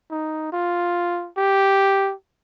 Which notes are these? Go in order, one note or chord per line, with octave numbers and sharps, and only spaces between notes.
D#4
F4
G4